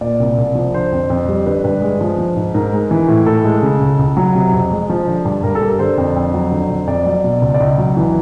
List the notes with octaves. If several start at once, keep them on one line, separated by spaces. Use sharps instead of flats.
A#2 D5
C2
C2
F3
D3 C5
F2
F2
G3
D3 B4
G2 B4
G#3
F3
F3
G#2
G#2 A#4
G#3
E3
A2
A2 A4
G#3
C#3
C#2
C#2
F#3
C3
F2
G#3
F3
D3
G2
G2 A#4
A4
G3
A#4
D3 C5
F2
F2
F#3
D3
F2
F2 D5
F#3
B2
C#2
D5
C#2 D#5
F#3
E3